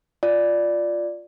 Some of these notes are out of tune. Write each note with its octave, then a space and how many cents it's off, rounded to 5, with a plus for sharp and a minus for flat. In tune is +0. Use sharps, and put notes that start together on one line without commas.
F4 +0 D5 +0